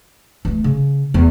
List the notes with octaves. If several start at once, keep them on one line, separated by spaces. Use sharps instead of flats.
E3 A3
C#3
E2